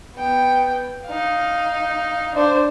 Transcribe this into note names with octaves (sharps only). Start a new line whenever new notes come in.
B3 G5
D#4 F5
D4 C5